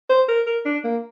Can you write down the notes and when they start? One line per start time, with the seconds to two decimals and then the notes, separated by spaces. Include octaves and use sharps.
0.09 C5
0.28 A#4
0.47 A#4
0.65 D4
0.84 A#3